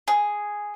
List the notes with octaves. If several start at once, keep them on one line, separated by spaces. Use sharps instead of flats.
G#4